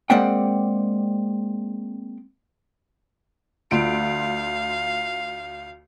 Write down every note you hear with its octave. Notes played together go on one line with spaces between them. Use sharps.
G#3 A#3 C4 D5 F#5 G5
D2 F4 F5 D7